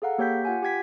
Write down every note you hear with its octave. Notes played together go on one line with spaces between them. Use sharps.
G#4 A4 F5 F#5 A#5
A#3 G4 C#5 G5 G6 B6
F4 F#5 G#5
G4 G5 G#6 B6